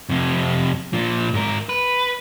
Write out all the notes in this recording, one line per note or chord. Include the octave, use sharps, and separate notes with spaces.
F2 C3
A#2 F3
G#2 A#4
B4